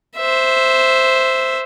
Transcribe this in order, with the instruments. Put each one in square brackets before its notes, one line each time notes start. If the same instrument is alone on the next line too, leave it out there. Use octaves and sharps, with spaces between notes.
[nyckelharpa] C5 E5